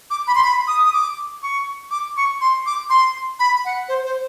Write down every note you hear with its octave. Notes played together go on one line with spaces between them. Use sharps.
D6
B5
C6
B5
D#6
D#6
D6
C#6
D6
C#6
C6
D6
C6
B5
F#5
C5
C5